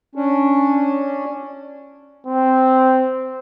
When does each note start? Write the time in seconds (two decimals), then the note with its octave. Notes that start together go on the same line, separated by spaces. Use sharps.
0.15 C#4 D4
2.27 C4